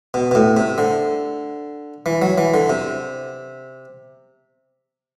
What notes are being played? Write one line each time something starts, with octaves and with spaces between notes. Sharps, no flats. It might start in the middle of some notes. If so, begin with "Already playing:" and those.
B2
B2
A2
C3
D3
E3
F#3
E3
D3
C3